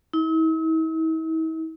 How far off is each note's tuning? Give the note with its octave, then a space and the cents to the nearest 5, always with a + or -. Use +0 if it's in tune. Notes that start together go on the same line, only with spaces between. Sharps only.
E4 -45